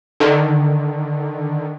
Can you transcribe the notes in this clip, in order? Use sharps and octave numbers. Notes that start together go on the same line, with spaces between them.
D3 D#3